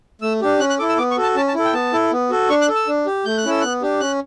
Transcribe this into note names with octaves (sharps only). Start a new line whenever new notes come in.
A3 E6
D4 G4
C#4 F#6
F#6
E4 A4 D6
E6
B3 D6
C#6
F#4 A4
A5
C#4 A5
A5
E4 A4
G5
B3 A5
E4 A4
B3
F#4 A4
D4 C#6
F#6
A4
E6
D4
G4
A3 G6
F#6
C#4 E4 A4 E6
B3 F#6
D4 G4
C#4 F#6